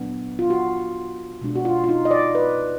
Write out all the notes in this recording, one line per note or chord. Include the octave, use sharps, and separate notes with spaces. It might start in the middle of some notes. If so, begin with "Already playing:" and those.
Already playing: A#2 F#3 B3 D4
F4
F#4
B2 G#3 D4
F#4
F4
F4
D#4
D#5
D5
B4